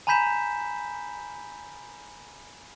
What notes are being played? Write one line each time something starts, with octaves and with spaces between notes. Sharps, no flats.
G#5 A#5 B5 G6 B6 E7